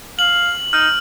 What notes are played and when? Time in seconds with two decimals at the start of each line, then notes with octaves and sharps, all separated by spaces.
0.19 F5 F#7
0.73 D#4 F6